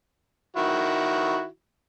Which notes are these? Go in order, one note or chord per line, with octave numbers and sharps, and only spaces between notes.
D#3 E4 F#4